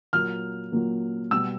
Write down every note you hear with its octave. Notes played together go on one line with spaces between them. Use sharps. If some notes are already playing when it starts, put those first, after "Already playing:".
A#2 F#3 A#3 F6
A#2 F#3 A#3
B2 G3 B3 E6